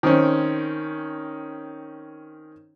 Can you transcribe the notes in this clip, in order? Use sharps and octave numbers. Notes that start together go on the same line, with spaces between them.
D#3 C4 C#4